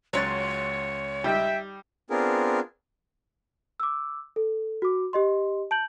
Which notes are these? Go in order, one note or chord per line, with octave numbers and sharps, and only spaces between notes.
C#2 F#3 C#4 F#4 C#5 C6 A6
G3 D#4 E5 G5
B3 C4 D4 F4 G#4 A#4
D6 E6
A4
F#4 D6
G4 D#5 C6
A5 G6 F#7